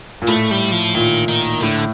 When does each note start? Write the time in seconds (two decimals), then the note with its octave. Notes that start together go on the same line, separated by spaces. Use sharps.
0.22 A#2
0.28 A2 A3
0.51 G3
0.72 F3
0.95 A#2 D#3
1.28 D#3
1.61 A2 D3